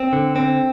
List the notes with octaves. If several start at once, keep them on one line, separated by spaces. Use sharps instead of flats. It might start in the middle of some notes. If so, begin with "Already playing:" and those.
Already playing: C4
D3
C4